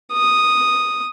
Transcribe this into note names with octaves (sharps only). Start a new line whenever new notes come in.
D#6